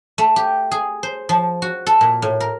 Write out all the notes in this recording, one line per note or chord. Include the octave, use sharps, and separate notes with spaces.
A3
G4
G#4
C5
F3
F#4
A4
A#2
A2
A#4